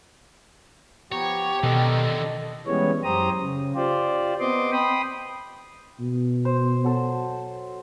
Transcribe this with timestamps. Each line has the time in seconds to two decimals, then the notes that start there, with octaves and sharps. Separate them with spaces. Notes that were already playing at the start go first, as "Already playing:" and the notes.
1.12 F3 B3 G4 C#5 A#5
1.63 B2 D3 D#3 A4 D#5
2.67 E3 G3 G#3 B3 C#4 C#5
3.03 F#2 G4 C5 A#5 D#6
3.40 C#3
3.75 F4 G4 C5 D5
4.40 B3 C4 D#5 C6 D6
4.72 G5 B5 C6 D#6
6.00 B2
6.45 C5
6.84 F#3 A4